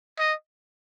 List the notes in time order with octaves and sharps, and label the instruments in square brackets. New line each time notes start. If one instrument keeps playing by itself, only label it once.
[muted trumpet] D#5